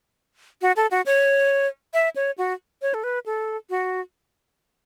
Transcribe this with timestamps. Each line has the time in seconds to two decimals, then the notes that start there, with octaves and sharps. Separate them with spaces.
0.62 F#4
0.76 A4
0.91 F#4
1.06 C#5
1.94 E5
2.16 C#5
2.38 F#4
2.82 C#5
2.94 A4
3.04 B4
3.26 A4
3.70 F#4